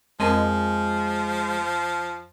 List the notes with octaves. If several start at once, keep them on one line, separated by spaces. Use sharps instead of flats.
F2 F3 G#3 C4 A#4